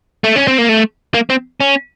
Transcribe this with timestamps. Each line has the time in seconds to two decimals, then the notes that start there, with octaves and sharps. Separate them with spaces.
0.24 A3
0.36 C#4
0.48 C4
0.58 A#3
0.69 A3
1.14 A#3
1.30 C4
1.60 C#4